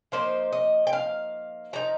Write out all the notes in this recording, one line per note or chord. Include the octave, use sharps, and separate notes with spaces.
F3 A#3 D#4 C5
D#5
G5
F5
F3 D#4 A#5